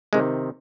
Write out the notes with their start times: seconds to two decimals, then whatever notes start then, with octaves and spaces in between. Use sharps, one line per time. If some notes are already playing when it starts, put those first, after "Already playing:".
0.13 C3 D#3 G#3